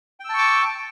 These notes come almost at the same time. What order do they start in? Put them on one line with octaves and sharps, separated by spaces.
G5 E6 A5 C#6 D6